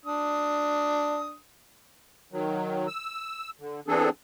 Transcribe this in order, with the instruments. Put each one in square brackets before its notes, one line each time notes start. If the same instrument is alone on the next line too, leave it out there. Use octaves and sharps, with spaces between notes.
[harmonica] D4 D#6
[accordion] D#3 F#3
E6
D3
E3 B3 C4 D4 G#4 A4